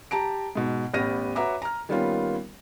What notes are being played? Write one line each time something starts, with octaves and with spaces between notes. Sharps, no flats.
G4 A5 A#5 D7
G#2 B2
A1 B3 G4 F6 A#6 D#7
F#4 B4 C#5 E5 A#5 D6
A#5 F6
D#3 G3 A#3 B3 C#4 F4